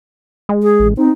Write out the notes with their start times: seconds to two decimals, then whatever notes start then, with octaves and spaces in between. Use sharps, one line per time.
0.49 G#3
0.63 G#4
0.80 A1
0.97 C4 D#4